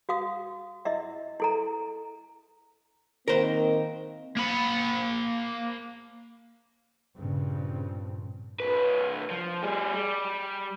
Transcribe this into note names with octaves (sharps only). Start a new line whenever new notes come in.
F#4 F5 D#6
E4 D#5 E5
E4 A4 A#5
D#3 A#3 C4 A#4 C5
A#3 B5
G2 A#2 C#3 C4
C2 B4
F3
G3 G#4
G3